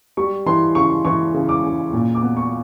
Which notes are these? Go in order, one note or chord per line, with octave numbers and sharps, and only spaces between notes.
G3 C#6
E3 C6
C#3 C#6
E3 C#6
C#3
D6
C#3
A#2
D6
B3
C#6